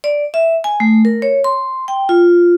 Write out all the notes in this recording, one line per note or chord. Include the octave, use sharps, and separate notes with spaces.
D5
E5
G#5
A3
A#4
C#5
C6
G5
F4